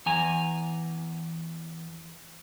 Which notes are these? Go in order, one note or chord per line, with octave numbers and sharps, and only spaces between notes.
E2 G#5 A#5